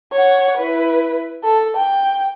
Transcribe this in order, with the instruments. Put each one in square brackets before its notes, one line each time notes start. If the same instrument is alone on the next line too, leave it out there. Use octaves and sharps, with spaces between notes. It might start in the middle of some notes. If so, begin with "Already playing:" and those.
[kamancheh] C#5 F#5
E4 B4
A4
G5